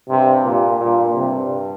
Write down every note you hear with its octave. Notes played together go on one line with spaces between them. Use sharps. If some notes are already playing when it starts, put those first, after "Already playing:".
G2 C3
G2 A#2
G2 A#2
G2 C3